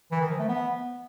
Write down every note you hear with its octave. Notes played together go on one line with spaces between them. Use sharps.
E3
D#3
F3
A3
B3